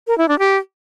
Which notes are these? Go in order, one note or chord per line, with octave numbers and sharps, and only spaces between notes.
A#4
E4
D4
G4